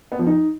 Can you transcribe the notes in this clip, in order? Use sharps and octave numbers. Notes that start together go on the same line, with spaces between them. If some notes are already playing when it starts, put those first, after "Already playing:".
B3
F3
D#4